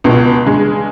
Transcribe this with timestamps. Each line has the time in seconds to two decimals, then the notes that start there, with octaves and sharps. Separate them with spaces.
0.04 C#2 B2
0.45 G2 C#3 G#3